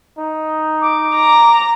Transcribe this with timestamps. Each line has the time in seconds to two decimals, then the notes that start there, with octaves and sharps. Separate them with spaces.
0.19 D#4
0.81 D6
1.15 A#5